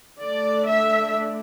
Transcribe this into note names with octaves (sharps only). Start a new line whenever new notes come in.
D3 A3 D4 D5
E5